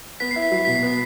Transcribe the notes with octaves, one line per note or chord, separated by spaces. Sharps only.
B3 B6
E4 C7
B6
F#3 C7
B2 B6
C7
B3 B6